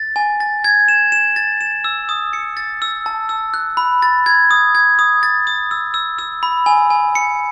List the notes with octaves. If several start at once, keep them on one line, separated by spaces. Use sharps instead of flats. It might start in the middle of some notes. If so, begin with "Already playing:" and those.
Already playing: A6
G#5
A6
G#6
E7
E7
A6
E7
E6
D#6
C#7
A6
E6
A5
E6
F#6
B5
A6
G#6
D#6
G#6
D#6
A6
D#6
E6
E6
E6
B5
G#5
G#5
C#7